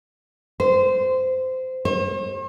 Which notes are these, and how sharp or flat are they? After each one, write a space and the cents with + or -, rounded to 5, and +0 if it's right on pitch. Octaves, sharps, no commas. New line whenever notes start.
C5 -20
C5 +45